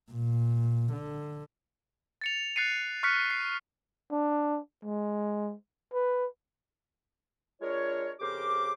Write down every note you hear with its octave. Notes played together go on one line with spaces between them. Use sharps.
A#2
D3
A6 C#7 F7
F#6 A6 C7 C#7 D#7
C#6 F6 F#6 B6 C#7
C7
D4
G#3
B4
G#3 D4 F4 A#4 C#5
F2 C#3 G4 A#4 C5 D6